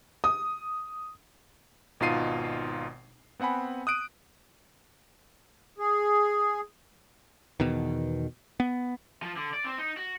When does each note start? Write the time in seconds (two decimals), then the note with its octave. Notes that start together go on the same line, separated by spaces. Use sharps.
0.24 D#6
2.00 G#1 B2 D#4 F4 C7 D#7
3.40 B3 C4 F#5 G#5 B5
3.87 D#6 F#6 D7 D#7
5.78 G#4
7.60 E2 B2 D#3
8.60 B3
9.22 F3
9.37 D3
9.54 D5
9.65 C4
9.79 D#4
9.97 F#4